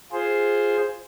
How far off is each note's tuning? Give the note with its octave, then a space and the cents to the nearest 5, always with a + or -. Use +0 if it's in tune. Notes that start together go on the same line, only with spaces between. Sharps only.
F4 +0 G#4 +0 C5 +5